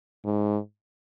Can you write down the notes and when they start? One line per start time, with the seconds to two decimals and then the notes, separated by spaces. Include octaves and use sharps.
0.25 G#2